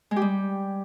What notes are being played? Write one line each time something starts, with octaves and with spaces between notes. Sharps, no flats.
G#3
G4
G3